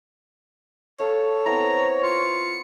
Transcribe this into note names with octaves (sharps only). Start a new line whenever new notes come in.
A4 C#5 F5
B3 C4 E4 A#5
F4 C#7